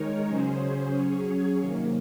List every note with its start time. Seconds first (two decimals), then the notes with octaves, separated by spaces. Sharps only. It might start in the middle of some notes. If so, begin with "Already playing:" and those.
Already playing: D#3 G#3 D#4 A#4 C#5
0.26 C#3 F#3 C#4 G#4 C5
0.93 F#3 C#4 G#4 C#5
1.59 C3 D#3 F#3 A#3